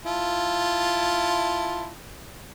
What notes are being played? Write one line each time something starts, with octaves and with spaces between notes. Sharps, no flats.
E4 F4 A5